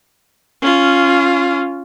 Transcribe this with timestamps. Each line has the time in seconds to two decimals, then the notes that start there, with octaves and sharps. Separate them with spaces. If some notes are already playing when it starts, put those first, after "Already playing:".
0.62 C#4 F4